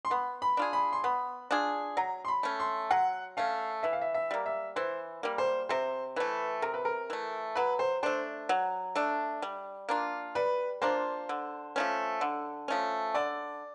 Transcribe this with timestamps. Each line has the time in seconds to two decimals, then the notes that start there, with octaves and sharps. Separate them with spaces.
0.05 C6
0.10 B3 B5
0.42 B5
0.57 D4 F4 G#4
0.73 B5
0.93 C6
1.04 B3 B5
1.51 D4 F4 G#4
1.97 F#3 A#5
2.25 C6
2.28 B5
2.43 A3 C#4
2.60 C6
2.91 F#3 F#5
3.37 A3 C#4 F5
3.83 E3 E5
3.93 F5
4.02 E5
4.14 E5
4.31 G3 A#3
4.46 E5
4.76 E3 C5
5.23 G3 A#3
5.38 C5
5.69 C3 C5
6.16 E3 A3 B4
6.62 C3 A#4
6.74 B4
6.85 A#4
7.10 E3 A3
7.55 F#3 B4
7.79 C5
8.03 A3 D4 C5
8.49 F#3
8.95 A3 D4
9.42 G3
9.89 A#3 D4 F4
10.35 G3 B4
10.82 A#3 D4 F4 C5
11.29 D3
11.76 F3 A3 C#4
12.21 D3
12.68 F3 A3 C#4
13.14 D3 D5